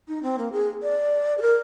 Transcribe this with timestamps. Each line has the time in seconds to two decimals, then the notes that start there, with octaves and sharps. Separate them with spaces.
0.08 D#4
0.23 C4
0.38 A#3
0.52 G#4
0.83 D5
1.38 G#4
1.42 A#4